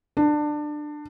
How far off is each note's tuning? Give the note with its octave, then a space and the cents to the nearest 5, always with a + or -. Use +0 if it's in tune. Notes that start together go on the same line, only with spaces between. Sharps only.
D4 +20